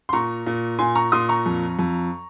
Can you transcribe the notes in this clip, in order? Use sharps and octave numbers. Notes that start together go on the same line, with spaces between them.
C6
A#2 A#5 C#6
A#2
A#2 G#5 C6
A#5 C#6
A#2 C6 D#6
A#5 C#6
F2
F2